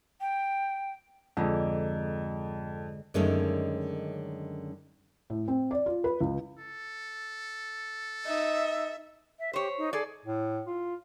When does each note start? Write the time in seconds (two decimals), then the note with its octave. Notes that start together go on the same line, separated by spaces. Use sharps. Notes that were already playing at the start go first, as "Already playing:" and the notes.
0.21 G5
1.37 F2 G#2 D3
3.14 F#2 D3 D#3 G#3 A3 C#4
5.30 A2
5.48 C4
5.71 D5
5.86 F4
6.04 B4
6.21 C#2
6.59 A4
8.27 D#4 E5
9.39 E5
9.53 G4 C5 C#5
9.78 D#4
9.93 G#4 A4 D5
10.25 A2
10.67 F4